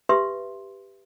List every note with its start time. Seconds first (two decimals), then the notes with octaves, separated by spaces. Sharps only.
0.09 G4 B4 E5 C6